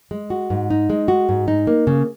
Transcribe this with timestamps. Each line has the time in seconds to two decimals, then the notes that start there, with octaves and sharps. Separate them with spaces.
0.11 G#3
0.30 F#4
0.50 G#2
0.70 D#4
0.90 G#3
1.08 F#4
1.29 G#2
1.48 D#4
1.67 A#3
1.87 C#3